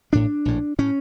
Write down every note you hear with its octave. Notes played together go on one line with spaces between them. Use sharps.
A1 A2 D4
A#1 A2
A2 C#4